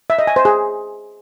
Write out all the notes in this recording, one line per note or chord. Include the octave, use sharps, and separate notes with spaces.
E5
D#5
G#5
C5
G#4